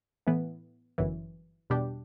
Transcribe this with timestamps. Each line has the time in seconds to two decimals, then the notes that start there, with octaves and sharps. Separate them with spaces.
0.27 A2 E3 B3
0.98 G1 F#2 E3
1.70 E2 B2 G3 D4 G4